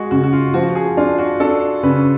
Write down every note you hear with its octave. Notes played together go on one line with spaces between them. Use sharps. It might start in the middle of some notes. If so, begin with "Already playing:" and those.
Already playing: G#3 F#4 G#4
C#3 F#4
F#4
F4
F3 F#4
G#4
D4 F4
F#4
D4 A4
C#3 B4